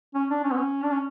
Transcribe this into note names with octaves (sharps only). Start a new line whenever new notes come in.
C#4
D4
C#4
B3
C#4
D4
C#4